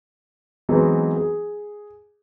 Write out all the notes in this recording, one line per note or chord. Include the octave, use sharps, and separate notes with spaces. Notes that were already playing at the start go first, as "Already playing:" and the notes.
E3 F#3 G#3 B3 C4 D#4
G#4